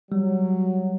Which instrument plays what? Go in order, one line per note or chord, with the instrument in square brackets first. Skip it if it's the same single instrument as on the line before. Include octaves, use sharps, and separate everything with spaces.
[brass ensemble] F#3 [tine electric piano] G3